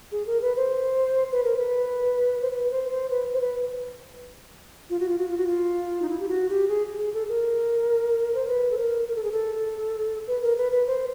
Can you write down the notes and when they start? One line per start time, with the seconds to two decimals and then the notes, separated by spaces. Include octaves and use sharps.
0.12 G#4
0.27 A#4
0.42 B4
0.57 C5
1.32 B4
1.44 A#4
1.57 B4
2.42 C5
2.51 B4
2.64 B4
2.71 C5
2.91 C5
3.10 B4
3.34 C5
3.41 B4
4.90 F4
5.00 F#4
5.09 F4
5.19 F#4
5.28 F4
5.38 F#4
5.47 F4
6.02 D#4
6.09 E4
6.20 G4
6.29 F#4
6.49 G4
6.69 G#4
6.99 G#4
7.14 A4
7.28 A#4
8.34 C5
8.48 B4
8.71 A4
8.78 A#4
9.08 A#4
9.16 A4
9.24 G#4
9.32 A4
10.27 B4
10.42 A#4
10.57 B4
10.72 B4
10.87 C5